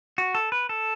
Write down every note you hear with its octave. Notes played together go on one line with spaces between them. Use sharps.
F#4
A4
B4
A4